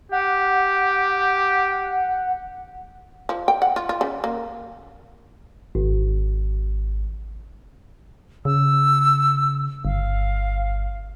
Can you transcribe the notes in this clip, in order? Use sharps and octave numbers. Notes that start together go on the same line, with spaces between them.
G4 F#5
F3
G5
F#5
F4
F4
C#3
A#3
G#1
C#3 E6
G1 F5